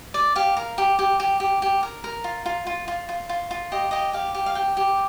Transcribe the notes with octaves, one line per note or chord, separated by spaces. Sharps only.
D5
G4 F5
A#4
G4
G4
G4
G4
G4
A#4
A#4
F4
F4
F4
F4
F4
F4
F4
G4 D#5
G4 D#5
G4 F5
G4
F5
G4 G5
G4